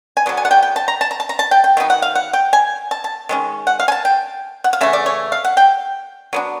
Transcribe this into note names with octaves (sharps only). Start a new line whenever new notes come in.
G#5
D3 F#3 B3
G#5
F#5
G5
G5
A5
A#5
A5
A#5
A5
A#5
A5
G5
G5
D#3 F#3 B3 D#4
F#5
F5
F#5
G5
G#5
A5
A5
D#3 G#3 C#4
F#5
F5
G#5
A5
G5
F#5
F5
C#3 E3 A3 E5
D5
C#5
F5
F#5
G5
F#3 B3 D4